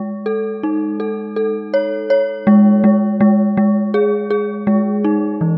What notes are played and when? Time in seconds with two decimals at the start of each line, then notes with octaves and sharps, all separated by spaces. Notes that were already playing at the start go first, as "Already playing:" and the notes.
Already playing: G#3
0.26 A4
0.63 D#4
1.00 A4
1.36 A4
1.74 C#5
2.10 C#5
2.47 G#3
2.84 G#3
3.21 G#3
3.57 G#3
3.94 G#4
4.30 G#4
4.67 G#3
5.04 D#4
5.41 E3